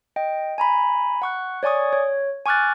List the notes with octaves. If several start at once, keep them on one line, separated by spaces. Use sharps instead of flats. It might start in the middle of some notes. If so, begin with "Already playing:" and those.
D#5 G5
G#5 A#5 B5
F#5 C#6 F#6
C#5 D5 G#5 C#6 D#6
C#5
G#5 C#6 D6 F6 F#6 A6